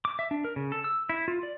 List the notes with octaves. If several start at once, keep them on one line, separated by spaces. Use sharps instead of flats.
D6
E5
D4
A#4
C#3
A4
E6
E4
F4
D5